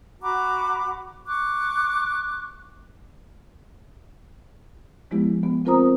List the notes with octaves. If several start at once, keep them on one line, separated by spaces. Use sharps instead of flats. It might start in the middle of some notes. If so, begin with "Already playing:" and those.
F#4 A#5 B5 D6
C#6 D6 F#6
F3 G#3 B3 E4 G4
B3
C4 F4 A#4 C5 A#5 D#6